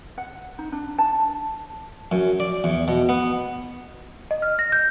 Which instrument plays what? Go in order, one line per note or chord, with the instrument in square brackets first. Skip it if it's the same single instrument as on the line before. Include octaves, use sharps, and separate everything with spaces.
[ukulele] F#5
D#4
D4
A5
[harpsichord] F#2
D5
E2
B2
B3
[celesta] D#5
F6
A#6
G6